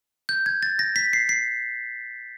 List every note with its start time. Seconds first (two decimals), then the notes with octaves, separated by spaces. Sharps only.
0.29 G6
0.46 G#6
0.63 A6
0.79 A#6
0.96 B6
1.13 C7
1.29 C7